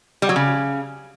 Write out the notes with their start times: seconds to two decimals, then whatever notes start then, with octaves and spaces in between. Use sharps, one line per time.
0.22 G3
0.29 F#3
0.36 C#3